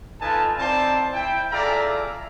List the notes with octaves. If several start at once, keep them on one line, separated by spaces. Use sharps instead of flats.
D#4 F4 A4 B4 G#5 A5
C4 D#4 E4 C5 D5 A5
E4 G5
F4 G#4 A4 D5 E5 A#5